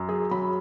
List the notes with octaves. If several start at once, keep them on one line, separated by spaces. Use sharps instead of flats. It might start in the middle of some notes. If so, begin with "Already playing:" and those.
Already playing: F#2
G#4
F#3 B5